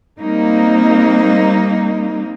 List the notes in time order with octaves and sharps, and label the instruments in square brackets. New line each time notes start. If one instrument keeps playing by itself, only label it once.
[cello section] G3 A#3 C4 D#4